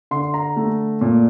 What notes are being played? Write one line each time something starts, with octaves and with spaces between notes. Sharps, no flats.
D3 C6
A#5
A3
A#2